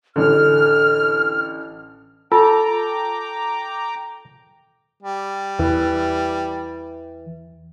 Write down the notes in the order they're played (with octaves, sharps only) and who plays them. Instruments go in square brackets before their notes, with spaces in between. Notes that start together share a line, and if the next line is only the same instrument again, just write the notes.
[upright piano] A1 D3 [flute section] F6
[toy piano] F4 [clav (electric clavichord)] A4 [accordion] G5 A#5 D6
[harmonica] G3
[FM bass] E2 [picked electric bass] E3